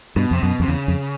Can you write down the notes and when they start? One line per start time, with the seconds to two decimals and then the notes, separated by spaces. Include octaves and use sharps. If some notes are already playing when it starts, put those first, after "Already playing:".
0.16 G2 B2
0.31 F2 C3
0.42 F#2 B2
0.60 F2 C3
0.68 E2 C#3
0.88 F2